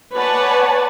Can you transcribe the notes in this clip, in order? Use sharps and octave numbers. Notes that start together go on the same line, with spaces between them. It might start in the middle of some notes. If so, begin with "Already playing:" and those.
B4 C#5 D5 F#5 G#5 A5